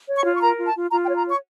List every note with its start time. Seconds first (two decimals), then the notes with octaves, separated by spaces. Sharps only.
0.08 C#5
0.16 C#6
0.25 F4
0.35 C#6
0.41 A#4 A#5
0.58 F4
0.67 A5
0.75 F4
0.92 F4 A#5
1.05 G5
1.09 C#5
1.17 A#5
1.26 C#5 C#6